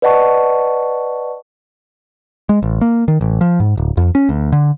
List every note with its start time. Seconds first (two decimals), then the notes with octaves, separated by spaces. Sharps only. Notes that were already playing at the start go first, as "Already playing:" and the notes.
0.02 B4 D5 D#5 F#5 A5 C#6
2.49 G#3
2.63 A1
2.81 A#3
3.08 D#3
3.21 A1
3.41 F3
3.60 G#2
3.77 D1
3.97 F2
4.15 C#4
4.29 D2
4.52 D3